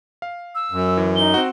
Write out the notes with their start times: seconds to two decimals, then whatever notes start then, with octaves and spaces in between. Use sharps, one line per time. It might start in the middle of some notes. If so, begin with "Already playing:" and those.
0.22 F5
0.55 E6
0.72 F#2
0.97 E3
1.16 D#4 G7
1.34 C4 F#4